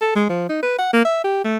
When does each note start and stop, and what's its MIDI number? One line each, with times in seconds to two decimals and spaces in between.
0.01 0.12 69
0.16 0.25 56
0.29 0.45 53
0.49 0.60 63
0.63 0.74 71
0.79 0.90 78
0.93 1.03 58
1.05 1.22 76
1.24 1.42 67
1.44 1.57 57